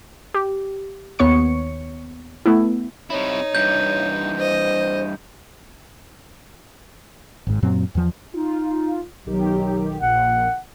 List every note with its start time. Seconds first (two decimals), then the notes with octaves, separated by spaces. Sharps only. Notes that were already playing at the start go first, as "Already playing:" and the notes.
0.34 G4
1.19 D#2 B3 C#5 C#6 C#7
2.46 A3 B3 E4
3.10 C3 D#4 E4 C#5
3.55 G2 E3 G6
4.38 C5 D#5
7.47 G#1 G#2
7.62 F#2 A#2 F#3 C4
7.95 E2 F3
8.34 D#4 F4
9.26 B1 D#3 F#3 G4
10.00 A#1 A#2 F#5